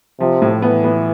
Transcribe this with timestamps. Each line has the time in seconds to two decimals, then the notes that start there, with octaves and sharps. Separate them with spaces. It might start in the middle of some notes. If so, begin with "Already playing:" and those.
0.20 C3 F3
0.42 A2
0.62 E3 B3
0.84 B3